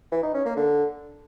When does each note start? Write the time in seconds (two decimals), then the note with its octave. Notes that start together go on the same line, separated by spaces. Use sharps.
0.12 E3
0.23 D#4
0.34 C#4
0.45 A#3
0.56 D3